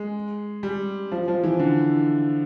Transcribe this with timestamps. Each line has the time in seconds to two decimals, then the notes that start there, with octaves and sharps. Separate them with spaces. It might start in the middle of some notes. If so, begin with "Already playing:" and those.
Already playing: G#3
0.63 G3
1.12 F3
1.28 F3
1.43 E3
1.59 D3